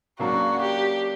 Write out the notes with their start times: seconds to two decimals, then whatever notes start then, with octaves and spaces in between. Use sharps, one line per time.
0.19 C#3 F#3 A#3 D4 F#4
0.62 G4